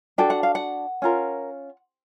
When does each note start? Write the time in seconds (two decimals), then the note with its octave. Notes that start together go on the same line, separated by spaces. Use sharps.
0.18 D4 F#4 A4 G5
0.30 F#5
0.43 F5
0.55 F#5
1.02 C#4 F4 A#4